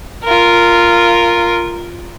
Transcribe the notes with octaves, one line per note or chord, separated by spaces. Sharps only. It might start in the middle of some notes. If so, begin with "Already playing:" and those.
F4 A#4